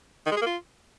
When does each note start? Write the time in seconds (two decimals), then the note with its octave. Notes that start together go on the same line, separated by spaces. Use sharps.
0.27 D#3
0.32 G#3
0.37 G#4
0.42 A#3
0.47 F4